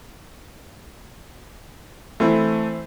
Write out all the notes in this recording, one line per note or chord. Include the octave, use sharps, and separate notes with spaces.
E3 A3 C4 E4